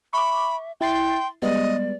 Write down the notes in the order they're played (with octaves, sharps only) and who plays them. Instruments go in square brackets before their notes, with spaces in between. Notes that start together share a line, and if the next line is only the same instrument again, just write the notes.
[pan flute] E5 [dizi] B5 [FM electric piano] C#6 D6
[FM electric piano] E4 A6 C7 [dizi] G5 [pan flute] C6
[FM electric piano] G3 G#3 B3 [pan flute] D5 [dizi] D#5